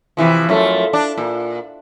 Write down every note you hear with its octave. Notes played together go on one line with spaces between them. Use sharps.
C3 E3 F3
F#2 F3 A3
D4
A#2